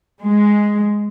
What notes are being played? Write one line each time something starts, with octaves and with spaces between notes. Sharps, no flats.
G#3